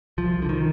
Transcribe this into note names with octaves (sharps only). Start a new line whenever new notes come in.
C2 F3
D3
D#3